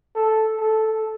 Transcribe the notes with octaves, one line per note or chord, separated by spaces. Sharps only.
A4
A4